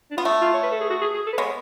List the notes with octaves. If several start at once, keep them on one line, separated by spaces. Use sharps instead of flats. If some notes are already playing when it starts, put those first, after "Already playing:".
D4
B3 F4
A3
F4
C#5
B4
A4
G#4
F#4
G#4
G#4
A4
B4
G#3 B3 C#5